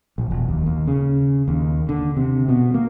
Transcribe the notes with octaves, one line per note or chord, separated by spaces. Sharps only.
A#1
E1
D#2
D#2
C#3
D#2
D3
C3
B2
A#3